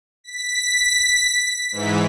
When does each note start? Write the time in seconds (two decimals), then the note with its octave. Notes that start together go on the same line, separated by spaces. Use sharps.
0.24 B6
1.72 G#2 E3